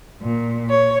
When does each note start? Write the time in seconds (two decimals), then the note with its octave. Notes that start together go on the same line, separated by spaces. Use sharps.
0.20 A#2
0.70 C#5